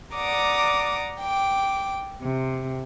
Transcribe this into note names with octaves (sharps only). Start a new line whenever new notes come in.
D5 F#5 A#5 D6 D#6
G5 D6
C3